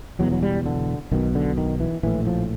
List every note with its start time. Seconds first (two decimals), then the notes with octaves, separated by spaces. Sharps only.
0.19 E1 E2 B2 F#3
0.32 F#3
0.43 G3
0.66 D3
1.12 B1 B2 D#3
1.35 D3
1.58 D#3
1.80 E3
2.03 A#1 A2 E3
2.27 F3